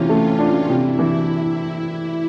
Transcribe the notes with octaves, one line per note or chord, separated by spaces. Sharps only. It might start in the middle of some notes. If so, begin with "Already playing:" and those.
Already playing: C3 E3 C#4 F4
A3
D4
C3 E4
E3